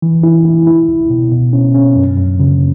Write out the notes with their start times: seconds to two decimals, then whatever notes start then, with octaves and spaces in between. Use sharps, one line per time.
0.02 E3
0.23 E4
0.45 E4
0.67 E4
0.88 C#2
1.10 B2
1.31 B2
1.53 C#4
1.74 C#4
1.96 F#2
2.18 F#2
2.40 C#3